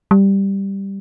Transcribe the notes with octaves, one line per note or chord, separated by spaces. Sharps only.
G3